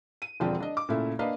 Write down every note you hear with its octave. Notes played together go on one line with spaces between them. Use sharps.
D#7
E1 D3 F3 C4 D4 G5
D4 D#5
D6
A#2 C#3 A3 E4
A#3 D4 B4 D#5 F5